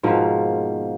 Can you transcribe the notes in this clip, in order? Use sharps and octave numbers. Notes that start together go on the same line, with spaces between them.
G#2 B2 F3 A#3